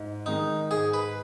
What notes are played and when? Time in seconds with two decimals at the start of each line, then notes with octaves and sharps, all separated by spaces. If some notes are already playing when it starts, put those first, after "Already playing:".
Already playing: G#2
0.26 D#3 G#3 D#4
0.71 G#2 G#4
0.94 B4